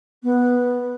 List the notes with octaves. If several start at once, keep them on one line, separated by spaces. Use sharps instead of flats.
B3